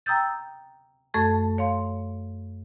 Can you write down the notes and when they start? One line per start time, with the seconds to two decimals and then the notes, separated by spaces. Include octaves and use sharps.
0.06 G5 A#5 D#6 E6 G6 A6
1.14 F#2 A3 A4 A5 C#6 G#6
1.58 C#5 F5 C6